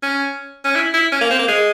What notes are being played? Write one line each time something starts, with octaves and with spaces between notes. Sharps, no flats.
C#4
C#4
E4
E4
C#4
A#3
C4
A#3
G#3